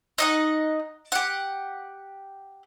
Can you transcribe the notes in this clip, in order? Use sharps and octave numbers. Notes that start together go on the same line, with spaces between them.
D#4 D#5 F#5
G4 F#5